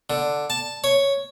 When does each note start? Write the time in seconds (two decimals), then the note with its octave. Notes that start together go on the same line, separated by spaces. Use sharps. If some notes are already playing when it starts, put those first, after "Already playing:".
0.10 D3
0.50 A5
0.84 C#5